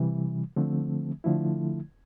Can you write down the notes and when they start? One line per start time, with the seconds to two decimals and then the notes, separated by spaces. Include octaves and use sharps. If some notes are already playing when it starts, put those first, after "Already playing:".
Already playing: C3 E3 G3
0.56 D3 F3 A3 C4
1.24 D3 F3 A3 E4